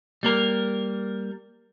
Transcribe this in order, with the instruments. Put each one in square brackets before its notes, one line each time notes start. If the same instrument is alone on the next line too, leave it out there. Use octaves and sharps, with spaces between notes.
[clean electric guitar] G3 A#3 A#4